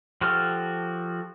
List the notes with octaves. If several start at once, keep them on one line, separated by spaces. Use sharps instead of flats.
F3 F#4 G4 A4 F6